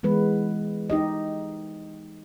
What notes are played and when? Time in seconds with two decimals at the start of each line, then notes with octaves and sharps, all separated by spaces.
0.03 E3 G#3 B3 B4
0.90 D#4 G4 D#5